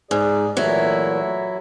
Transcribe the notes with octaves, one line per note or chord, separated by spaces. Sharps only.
G#2 G#4 D5
A#2 E3 F#3 A3 E4